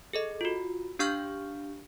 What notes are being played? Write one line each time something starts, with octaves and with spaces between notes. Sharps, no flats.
G#4 A4 D#5
F4 F#4
D4 G4 F5 C#6 F6 G6